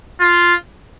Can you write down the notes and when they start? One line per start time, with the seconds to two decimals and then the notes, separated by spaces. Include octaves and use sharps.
0.21 F4